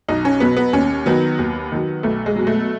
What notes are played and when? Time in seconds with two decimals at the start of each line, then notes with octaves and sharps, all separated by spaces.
0.08 B1 D#4
0.25 C#4
0.40 B2 F#3 B3
0.57 B3
0.73 D#2 C#4
1.06 D#3 F#3 B3
1.39 D#2
1.72 D#3 F#3
2.03 B1 A3
2.26 G#3
2.36 B2 F#3
2.47 A3